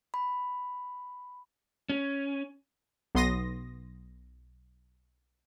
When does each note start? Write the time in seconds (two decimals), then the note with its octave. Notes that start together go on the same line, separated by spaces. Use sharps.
0.14 B5
1.90 C#4
3.15 B1 B3 C6 D#6 A#6